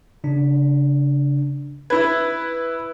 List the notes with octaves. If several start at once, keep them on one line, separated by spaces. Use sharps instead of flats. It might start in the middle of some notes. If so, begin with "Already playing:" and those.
C#3 D4
E4 B4 G#6